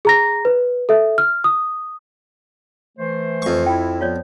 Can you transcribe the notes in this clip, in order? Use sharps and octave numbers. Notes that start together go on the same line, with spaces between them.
G#4 A#5 A#6
B4
A4 E5
F6
D#6
E3 A3 C5
F2 C#6
E4 G5
F3 B3 F4 C#5 D5